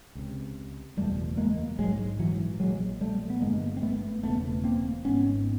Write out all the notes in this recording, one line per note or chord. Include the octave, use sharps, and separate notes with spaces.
C#2 C3
F#1 E2 B2 G3 A3
G#3 A#3
A#1 G#2 F#3 G#3
E3 F#3
A#1 A#2 F#3 G#3
G3 A3
B3
G1 G2 D3 G#3 A#3
C4
A3 B3
E1 E2 C#3 A3 B3
A#3 C4
G#1 G#2 B3 C#4